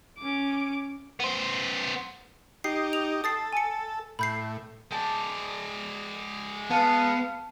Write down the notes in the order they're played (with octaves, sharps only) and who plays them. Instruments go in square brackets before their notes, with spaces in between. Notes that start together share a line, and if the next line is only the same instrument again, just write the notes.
[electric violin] C#4 D6
[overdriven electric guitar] B3 C5
[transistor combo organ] D#4 G4 [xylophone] C7
[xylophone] F7
[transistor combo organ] A4 [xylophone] D#6 A6 C7
[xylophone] G#5 C#7
[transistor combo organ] A2 [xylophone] B5 G6 C7
[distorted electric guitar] G#3 D5 [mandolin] G5 A5
[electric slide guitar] B3 [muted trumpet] F5 [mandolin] A5